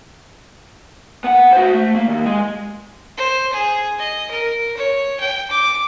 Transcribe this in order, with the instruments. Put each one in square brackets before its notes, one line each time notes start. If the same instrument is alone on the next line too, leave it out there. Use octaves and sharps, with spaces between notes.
[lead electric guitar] B3 F#5
F#4 C5
A3
A#3
D#2
G#3
[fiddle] C5
G#4
D#5
A#4
C#5
G5
D6